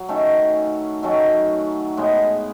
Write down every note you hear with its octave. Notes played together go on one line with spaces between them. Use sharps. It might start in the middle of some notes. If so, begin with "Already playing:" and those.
Already playing: F#3
D#3 A3 C#4
D#3 F#3 A3 C#4
A2 G#3 B3